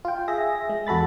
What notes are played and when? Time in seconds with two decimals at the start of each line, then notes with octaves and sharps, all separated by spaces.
0.05 F4 G5
0.28 G#4 E5 A#6
0.69 G#3
0.87 E2 F#4 A4 B5 A6